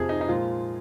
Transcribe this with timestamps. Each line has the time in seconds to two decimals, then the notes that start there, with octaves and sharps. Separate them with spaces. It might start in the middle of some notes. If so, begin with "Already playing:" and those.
Already playing: F2 C3 F3 G#4
0.09 D#4
0.21 D#4
0.29 A#2 F3 G#3 F4